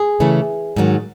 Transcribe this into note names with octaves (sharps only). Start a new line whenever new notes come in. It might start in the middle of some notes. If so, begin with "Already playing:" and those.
Already playing: G#4
C#3 E3 A3 C#4
G#2 D#3 F#3